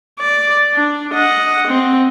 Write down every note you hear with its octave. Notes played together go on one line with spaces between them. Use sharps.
D5
D4
D#5 F#5
C4